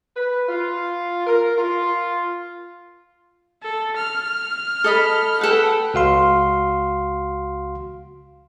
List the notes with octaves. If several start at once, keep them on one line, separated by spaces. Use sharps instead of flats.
B4
F4
A#4
F4
A4
F6
A4 D#5 B5
A4 B4 F#5 G5
C#2 F#4 F5 C6